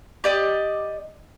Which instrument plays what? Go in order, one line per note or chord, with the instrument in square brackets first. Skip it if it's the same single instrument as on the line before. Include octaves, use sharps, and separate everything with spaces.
[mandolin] G4 D5 D#5